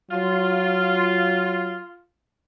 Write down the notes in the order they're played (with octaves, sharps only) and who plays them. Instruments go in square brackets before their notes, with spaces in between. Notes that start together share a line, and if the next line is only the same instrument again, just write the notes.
[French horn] F#3 [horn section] F4